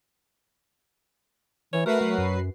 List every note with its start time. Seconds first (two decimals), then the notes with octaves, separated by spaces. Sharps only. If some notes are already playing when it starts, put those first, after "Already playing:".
1.73 E3 C#5
1.86 A3 F#4 A#4 B4 C7
2.01 F#3 A3
2.18 F#2